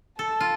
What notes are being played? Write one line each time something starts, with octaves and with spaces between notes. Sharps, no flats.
A4 A5
F4